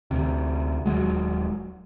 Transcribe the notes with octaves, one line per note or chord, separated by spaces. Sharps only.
D2 C3
D#1 E2 F#3 G#3